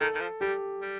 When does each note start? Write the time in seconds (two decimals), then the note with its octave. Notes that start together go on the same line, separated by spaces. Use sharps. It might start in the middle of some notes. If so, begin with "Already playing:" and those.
0.01 D#3 A4
0.15 D#3
0.21 F3
0.41 G3 G4
0.82 G3